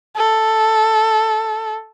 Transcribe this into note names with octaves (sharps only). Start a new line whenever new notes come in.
A4